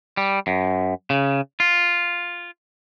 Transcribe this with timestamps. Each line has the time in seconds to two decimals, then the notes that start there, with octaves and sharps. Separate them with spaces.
0.17 G3
0.47 F#2
1.10 C#3
1.60 F4